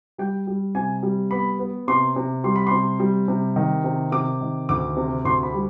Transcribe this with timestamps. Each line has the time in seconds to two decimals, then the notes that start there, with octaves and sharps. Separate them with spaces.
0.18 G3 G5
0.47 G3
0.75 C3 G#5
1.03 G3
1.31 B3 B5
1.59 B3
1.88 C3 C6
2.16 C3
2.44 G3 C6
2.56 B5
2.67 C3 C6
2.99 G3
3.28 C3
3.56 D#3
3.84 C3
4.12 C3 D6
4.41 D#3
4.69 D2 D6
4.97 C3
5.24 D2 C6
5.43 B5
5.54 G3